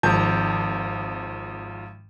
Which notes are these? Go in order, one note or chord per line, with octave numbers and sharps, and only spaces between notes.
G#1 F3 A5 G6